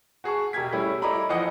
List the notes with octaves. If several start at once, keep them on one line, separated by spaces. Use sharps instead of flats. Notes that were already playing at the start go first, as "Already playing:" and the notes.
F#4 G#4 A5 C#6
E1 G4 A#4 G#6 B6
G3 A3 C#4 E4
E4 A4 D5 D#5 A#5 B5
E3 F3 D#5 F#5 D#6 C#7